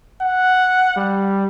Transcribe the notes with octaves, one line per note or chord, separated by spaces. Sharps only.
F#5
G3